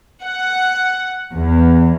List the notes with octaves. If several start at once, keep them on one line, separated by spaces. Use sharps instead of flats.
F#5
E2